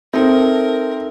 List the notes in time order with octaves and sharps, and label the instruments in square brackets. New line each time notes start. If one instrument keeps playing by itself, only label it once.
[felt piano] C4 [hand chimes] D#4 A4 E5 [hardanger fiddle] A#4